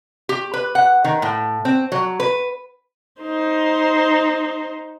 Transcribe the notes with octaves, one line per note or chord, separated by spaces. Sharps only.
G4
B4
F#5
D#3
A2
C4
F#3
B4
D#4 C5